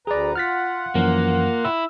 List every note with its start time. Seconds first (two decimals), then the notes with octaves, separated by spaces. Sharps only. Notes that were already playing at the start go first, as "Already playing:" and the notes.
0.07 D2 G#4 B4 D5 A#5
0.36 F4 F#5 F6 A6 B6
0.95 F#2 E3 F3 A#3
1.65 E4 E6